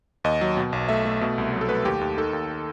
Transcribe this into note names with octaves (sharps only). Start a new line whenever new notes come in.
D#2 D#5
F#3
B2
B1
A3 E5
A3
B2
C2
F#3
A4
A3 B4
D#2 G4
D#2
D#3 A4
D#2